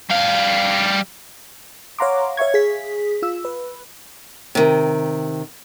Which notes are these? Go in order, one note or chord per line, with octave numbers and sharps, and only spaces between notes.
G3 F5
C#5 F5 F#5 A#5 C6 D6
C#5 E5 F5 C#6 G#6
G#4 B6
F4 E6
B4
C3 D#3